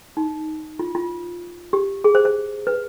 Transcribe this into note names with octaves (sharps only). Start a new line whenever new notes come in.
D#4
F4
F4
G4
G#4
C5
C5
B4